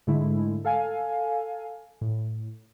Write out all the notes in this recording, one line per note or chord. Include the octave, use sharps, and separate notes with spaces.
G#2 D3 G#3 A3 E4
A4 F5 G#5
A2